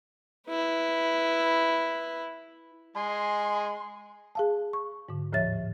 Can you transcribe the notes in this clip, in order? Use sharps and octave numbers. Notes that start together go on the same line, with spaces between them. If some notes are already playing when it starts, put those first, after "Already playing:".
E4 B4
G#3 G#5 C6
G#4 F5 A5
C#6
G#2 D3
D#2 A2 F3 C#5 E5 A6